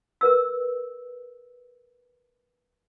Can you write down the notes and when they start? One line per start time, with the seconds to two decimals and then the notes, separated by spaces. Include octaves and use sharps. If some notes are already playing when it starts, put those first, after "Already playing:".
0.21 A#4 B4 E6